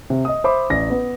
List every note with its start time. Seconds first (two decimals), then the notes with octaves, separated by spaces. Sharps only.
0.10 C3
0.25 D#5 D#6
0.44 C5 E5 B5 D6
0.70 A1 D5 A#6
0.90 B3 B4